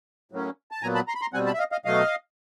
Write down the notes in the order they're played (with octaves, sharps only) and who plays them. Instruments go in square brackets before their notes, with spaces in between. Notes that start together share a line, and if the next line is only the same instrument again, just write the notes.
[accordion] A2 F#3 A#3 C#4
A5
A#2 F#3 B3 G#5 A#5
A5 B5
A#5 C6
B5
A#5 C6
B2 G3 C4 F#5 G#5
A5 B5
E5
D#5 F5
D#5 F5
B2 F#3 A3 D#5 F5